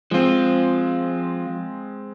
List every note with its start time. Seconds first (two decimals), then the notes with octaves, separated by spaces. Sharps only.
0.11 F3 G#3 C4 F4